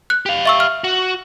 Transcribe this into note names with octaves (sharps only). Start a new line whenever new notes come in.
F#6
G4 F5
E5 C#6 E6
F6
F#4